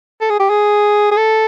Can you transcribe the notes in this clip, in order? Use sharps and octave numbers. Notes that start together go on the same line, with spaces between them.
A4
G#4
G4
G#4
G#4
A4